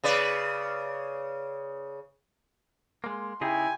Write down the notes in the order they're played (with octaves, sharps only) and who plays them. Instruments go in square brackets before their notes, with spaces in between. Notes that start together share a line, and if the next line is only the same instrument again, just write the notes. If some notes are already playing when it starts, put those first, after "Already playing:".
[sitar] C#3 B4 D5
[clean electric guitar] G#3 A#3 [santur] C6
[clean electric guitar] C#3 D#4 G#4 [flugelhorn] E4 [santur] G4 [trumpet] G#5